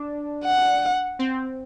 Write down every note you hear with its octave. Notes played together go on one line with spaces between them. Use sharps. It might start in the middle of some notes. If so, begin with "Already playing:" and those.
Already playing: D4
F#5
C4